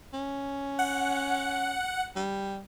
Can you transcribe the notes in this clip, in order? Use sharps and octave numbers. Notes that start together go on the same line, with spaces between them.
C#4
F#5
G3